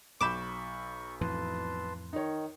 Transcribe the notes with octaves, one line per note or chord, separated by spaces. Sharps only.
B1 B5 C#6 D6 G6 E7
F2 A2 E3 B4 A5 C6
D#3 D#4 C#5